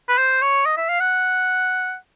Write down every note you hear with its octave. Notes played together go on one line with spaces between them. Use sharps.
B4
C5
C#5
D#5
E5
F5
F#5